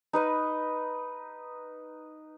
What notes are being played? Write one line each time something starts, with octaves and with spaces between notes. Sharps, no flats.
D#4 B4 D#5